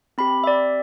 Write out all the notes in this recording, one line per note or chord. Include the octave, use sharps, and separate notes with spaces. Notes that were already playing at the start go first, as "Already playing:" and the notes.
C4 G4 B5
E5
D5